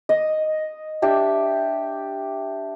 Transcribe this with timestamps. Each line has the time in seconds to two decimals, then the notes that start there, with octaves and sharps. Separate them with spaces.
0.09 D#5 D#6
1.02 D4 G4 E5